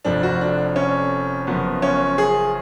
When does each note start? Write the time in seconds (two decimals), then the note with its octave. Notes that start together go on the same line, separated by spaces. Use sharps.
0.05 F1 F2 F3 D4
0.23 F#4
0.41 D4
0.76 C#4
1.47 F#1 F#2 F3 B3
1.82 C#4
2.18 G#4